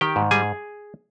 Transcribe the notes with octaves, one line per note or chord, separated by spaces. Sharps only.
D#3 G4 G5
G#2
G3 G#4 G#5